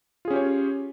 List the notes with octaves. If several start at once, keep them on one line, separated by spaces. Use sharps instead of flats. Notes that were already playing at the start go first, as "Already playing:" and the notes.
C#4 F4 G4 G#4 C#5